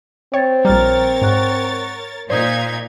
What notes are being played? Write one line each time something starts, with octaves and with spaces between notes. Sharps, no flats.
C4 C#5 G5 A6
A#1 G3 A#4 C#5 A#5 F6 A6
G#2 F#5 C#6 F#6
A#2 D#4 C5 D5 D#6 G6 G#6